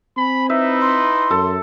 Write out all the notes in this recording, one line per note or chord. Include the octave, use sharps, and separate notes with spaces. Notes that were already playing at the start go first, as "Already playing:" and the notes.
C4 G#5 B5
D#4 E4 B4 E5
C6
F#2 A4